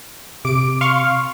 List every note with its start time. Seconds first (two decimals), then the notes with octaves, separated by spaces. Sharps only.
0.45 C3 D6 D7
0.81 F5 C6 C#6